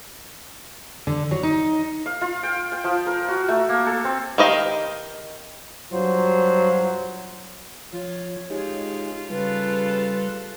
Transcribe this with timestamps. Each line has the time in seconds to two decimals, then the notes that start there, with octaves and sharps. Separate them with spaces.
1.07 D3
1.31 F#3
1.43 D#4
2.06 F5
2.21 F4
2.43 G5
2.72 G5
2.84 F3
3.07 A#4
3.28 F#4
3.48 A3
3.69 A#3
3.86 A4
4.04 C4
4.38 D#3 G4 D#5 F5
5.93 G2 F#3 F4 C5
7.93 F3 F4 C#5
8.50 G#3 D#4 F4 G4
9.30 C#3 G3 F4 A4 B4